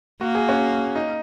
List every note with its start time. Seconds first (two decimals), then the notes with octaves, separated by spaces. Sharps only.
0.21 A#3 F#4
0.35 G#4
0.49 C#4 F#4
0.96 D#4